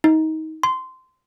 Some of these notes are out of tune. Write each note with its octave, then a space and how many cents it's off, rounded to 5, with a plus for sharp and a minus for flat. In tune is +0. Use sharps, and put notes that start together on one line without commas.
D#4 +25
C6 -15